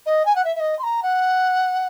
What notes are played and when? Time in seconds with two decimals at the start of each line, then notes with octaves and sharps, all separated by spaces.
0.06 D#5
0.25 G#5
0.35 F#5
0.45 E5
0.55 E5
0.60 D#5
0.79 C6
0.83 A#5
1.03 F#5